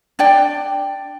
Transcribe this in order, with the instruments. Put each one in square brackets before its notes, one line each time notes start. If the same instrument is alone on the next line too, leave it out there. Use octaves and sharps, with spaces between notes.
[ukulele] D4 D5 G5